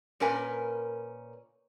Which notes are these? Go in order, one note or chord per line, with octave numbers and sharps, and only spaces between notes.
A#2 C#4 A#4 B4 G#5